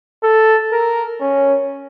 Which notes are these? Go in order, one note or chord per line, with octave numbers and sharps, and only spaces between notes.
A4
A#4
C#4